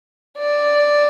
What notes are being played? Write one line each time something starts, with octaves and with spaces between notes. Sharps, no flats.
D5